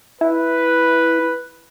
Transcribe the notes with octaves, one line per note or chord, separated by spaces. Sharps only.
E4 B4